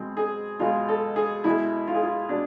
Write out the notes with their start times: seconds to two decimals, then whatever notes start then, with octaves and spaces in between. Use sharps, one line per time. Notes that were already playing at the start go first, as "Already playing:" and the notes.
Already playing: B2 G#3 C4
0.17 G#4
0.59 B2 G#3 F4
0.88 A4
1.16 G#4
1.44 B2 G#3 E4
1.87 F4
1.94 G#4
2.03 F4
2.29 B2 D4